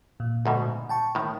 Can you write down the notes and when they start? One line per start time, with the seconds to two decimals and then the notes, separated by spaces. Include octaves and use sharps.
0.20 A#2
0.46 D2 G#2 B2
0.89 G5 A5 C#6
1.15 A2 D#3